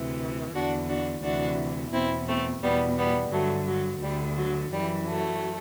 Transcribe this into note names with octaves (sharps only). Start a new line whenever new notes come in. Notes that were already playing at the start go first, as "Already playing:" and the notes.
Already playing: D2 C3 E3
E2 D3 D4 F#4
D4 F#4
D2 C3 E3 D4 F#4
E2 B2 C4 E4
A3 C4
E2 B2 G3 B3
G3 B3
G2 D3 F#3 A3
F#3
D2 D3 G3
F#3
F#2 E3 G3
F#3 A3